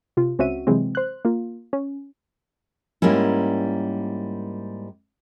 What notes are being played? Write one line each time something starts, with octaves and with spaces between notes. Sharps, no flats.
C3 F4
C#2 C4 C#4 F#4 E5 D#7
C3 E3 F#3 G#3 C4
C5 F#6
A#3 F4
C#4
G#2 G3 A#3 C#4 E4